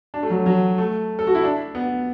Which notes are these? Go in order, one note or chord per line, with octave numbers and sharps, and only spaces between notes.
D4
A3
F#3
F#3
A3
A4
F#4
E4
D4
B3